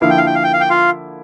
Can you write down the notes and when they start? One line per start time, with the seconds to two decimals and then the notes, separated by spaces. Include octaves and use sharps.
0.01 D3 F3 A#3 E4 F5
0.10 G5
0.18 F5
0.26 G5
0.35 F5
0.44 G5
0.53 F5
0.60 G5
0.70 F4 F5